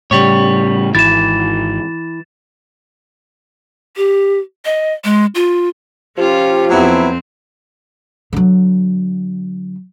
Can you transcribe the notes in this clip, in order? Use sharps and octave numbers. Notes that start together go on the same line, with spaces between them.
A2 C#3 G3 C#5
G#1 E3 A6 E7
G4
D#5
G#3
F4
F3 C#4 F4 G4
F2 F#3 B3 C4 E4
D3 F#3